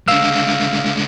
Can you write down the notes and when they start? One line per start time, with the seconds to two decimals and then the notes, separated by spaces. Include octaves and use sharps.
0.08 C#2 D3 F5 E6 F6